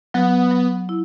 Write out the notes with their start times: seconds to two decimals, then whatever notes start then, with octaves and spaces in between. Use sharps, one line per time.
0.14 F#3 B3
0.51 F#3
0.89 E4